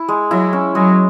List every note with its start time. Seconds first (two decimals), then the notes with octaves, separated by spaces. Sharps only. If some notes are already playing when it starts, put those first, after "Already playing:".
Already playing: E4
0.08 G#3
0.31 F#3 E4
0.53 C#4
0.75 F#3 G#3